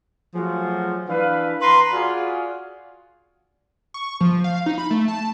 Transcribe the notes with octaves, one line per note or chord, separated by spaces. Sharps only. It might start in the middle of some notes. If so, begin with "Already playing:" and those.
F3 F#3 A3 F4 F#4 G#4
E3 D4 B4 F5
B4 A#5 C6
F4 F#4 G#4 D5 F5 F#5
C#6
F3
F5
D#4
B5
A3
A5